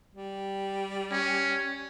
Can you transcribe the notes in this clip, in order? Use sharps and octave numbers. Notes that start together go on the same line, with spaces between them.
G3
C#4